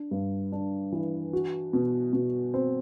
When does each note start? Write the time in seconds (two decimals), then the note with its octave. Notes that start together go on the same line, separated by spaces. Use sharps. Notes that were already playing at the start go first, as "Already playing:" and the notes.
Already playing: D4
0.11 G2
0.52 D4
0.92 E3
1.33 F#4
1.73 B2
2.13 B2
2.54 C4